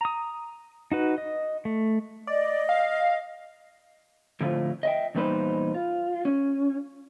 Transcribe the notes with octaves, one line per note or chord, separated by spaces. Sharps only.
A#5 D#6
D#4 F#4 B4
D#5
A3
D5 D#5
F5
A2 D3 F3 A3 C4 F4
D#5 E5 G5
E2 A#2 G3 D#4 B4 C5
F4
C#4